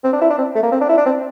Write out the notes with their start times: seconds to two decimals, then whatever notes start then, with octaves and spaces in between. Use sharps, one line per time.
0.04 C4
0.13 D4
0.21 E4
0.30 D4
0.38 C4
0.55 A3
0.63 A#3
0.72 C4
0.81 D4
0.89 E4
0.97 D4
1.06 C4